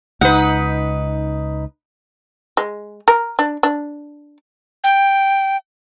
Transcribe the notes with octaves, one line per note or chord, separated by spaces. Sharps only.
C#2 D#4 B4 F#5
G#3
A#4
D4
D4
G5